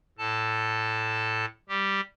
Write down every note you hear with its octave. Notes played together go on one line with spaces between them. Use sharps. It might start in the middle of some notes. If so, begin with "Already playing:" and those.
A2 A4 A5
G3 G4